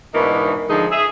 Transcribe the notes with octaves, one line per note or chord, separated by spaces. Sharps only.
G#2 B2 E3 A#3 D4 D#4
D3 F3 G#3 D#4 G#4
G#4 E5